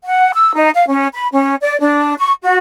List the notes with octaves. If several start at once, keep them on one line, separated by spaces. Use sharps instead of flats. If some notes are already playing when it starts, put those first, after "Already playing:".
F#5
E6
D#4
F5
C#4
B5
C#4
D5
D4
C#6
F#4